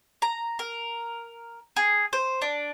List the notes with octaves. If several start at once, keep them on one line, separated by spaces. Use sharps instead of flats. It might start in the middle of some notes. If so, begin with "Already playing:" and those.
A#5
A#4
G#4
C5
D4